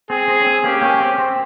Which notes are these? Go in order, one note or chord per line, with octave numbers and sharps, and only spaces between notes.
C4 G#4
C4
C#4
C4
A#3 C#4 G4
A#3 C#4
C4
C4